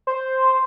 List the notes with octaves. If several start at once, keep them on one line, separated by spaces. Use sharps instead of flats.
C5